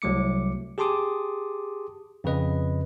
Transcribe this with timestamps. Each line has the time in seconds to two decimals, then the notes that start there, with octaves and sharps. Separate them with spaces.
0.02 C2 F#3 A3 D6 C#7
0.78 G4 G#4 A5 C6 D6 D#6
2.24 F2 C#3 B4 D#5